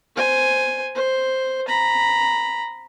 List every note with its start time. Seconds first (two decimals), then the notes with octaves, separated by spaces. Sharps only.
0.16 C5 G#5
0.95 C5
1.68 A#5 B5